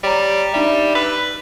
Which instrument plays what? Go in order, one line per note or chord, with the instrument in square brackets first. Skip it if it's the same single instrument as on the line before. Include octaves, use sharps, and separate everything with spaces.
[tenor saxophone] G3 [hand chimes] C#5 A#5
[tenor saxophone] G3 [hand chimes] D4 D#4 E5
[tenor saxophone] B4 [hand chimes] E6 F#6